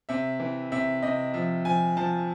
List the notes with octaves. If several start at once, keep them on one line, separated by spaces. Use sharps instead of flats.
C3 E5
E3
C3 E5
C3 D#5
F3 E5
F3 G#5
F3 A5